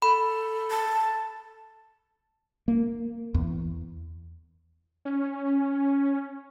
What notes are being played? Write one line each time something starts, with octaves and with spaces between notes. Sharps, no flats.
A4 B5
A5
A#3
E2
C#4